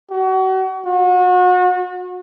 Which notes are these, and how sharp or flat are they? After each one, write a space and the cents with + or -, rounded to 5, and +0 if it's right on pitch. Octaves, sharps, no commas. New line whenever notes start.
F#4 +35
F#4 -35